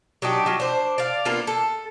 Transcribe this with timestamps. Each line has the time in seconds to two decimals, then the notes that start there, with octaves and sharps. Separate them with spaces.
0.22 F#3 D4 D#4 G4
0.46 F#3 F4
0.60 D4 C5
0.98 D5 F5
1.25 A#3 B3 D4 F4
1.47 A4